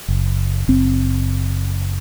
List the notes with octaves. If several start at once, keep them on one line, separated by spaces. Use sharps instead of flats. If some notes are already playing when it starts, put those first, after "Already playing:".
F#1
F#1 C4